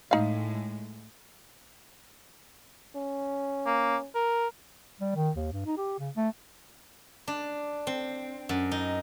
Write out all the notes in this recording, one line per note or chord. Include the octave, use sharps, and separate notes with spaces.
A2 G#3 D#4 F5
C#4
A#3
A#4
G3
D#3
D#2
G2
D#4
G4
C#3
A3
D4
C4
F#2
D#4